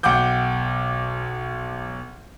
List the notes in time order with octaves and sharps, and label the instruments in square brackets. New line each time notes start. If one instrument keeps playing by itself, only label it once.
[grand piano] B1 F#5 G5 D6 G6